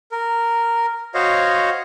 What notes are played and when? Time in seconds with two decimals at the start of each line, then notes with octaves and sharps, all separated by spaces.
0.12 A#4
1.14 F#4 C5 C#5 D#5 F5